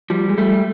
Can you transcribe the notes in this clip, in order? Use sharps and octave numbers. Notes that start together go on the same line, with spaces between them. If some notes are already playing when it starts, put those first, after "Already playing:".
F3 G3
G#3
G3 A3